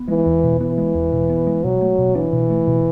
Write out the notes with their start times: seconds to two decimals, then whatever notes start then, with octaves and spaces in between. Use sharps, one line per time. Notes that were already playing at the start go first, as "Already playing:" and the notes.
Already playing: B3
0.08 E3 G#3
0.26 E2
0.44 B2
0.60 E3 B3
0.78 G#3
0.94 E2
1.12 B2
1.30 B3
1.47 G#3
1.64 B2 F#3
1.81 A3
1.98 B2
2.15 E3 D4
2.33 B2
2.50 A3
2.68 B2